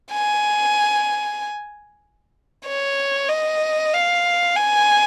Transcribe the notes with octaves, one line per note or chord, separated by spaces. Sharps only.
G#5
C#5
D#5
F5
G#5